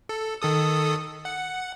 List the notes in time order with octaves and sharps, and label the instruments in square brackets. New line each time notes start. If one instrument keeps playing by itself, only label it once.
[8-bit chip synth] A4
D#3 A4 D#6
F#5